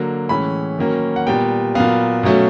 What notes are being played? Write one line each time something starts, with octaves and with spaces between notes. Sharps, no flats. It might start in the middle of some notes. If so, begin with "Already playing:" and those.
Already playing: D3 F#3 A#3
A2 E3 G#3 C#4 B5
D#3 F#3 A#3 C#4
F#5
A#2 G3 B3 G5
A#2 F#3 B3 F5
B2 F#3 A3 C#4